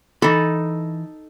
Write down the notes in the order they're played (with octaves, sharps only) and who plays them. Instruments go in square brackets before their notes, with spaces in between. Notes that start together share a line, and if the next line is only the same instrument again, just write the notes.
[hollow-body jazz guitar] E3 B5 [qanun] D#4 A4